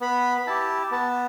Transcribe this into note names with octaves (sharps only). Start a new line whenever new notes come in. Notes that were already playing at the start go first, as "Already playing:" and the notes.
B3 B5
E4 G4 A5
B3 A5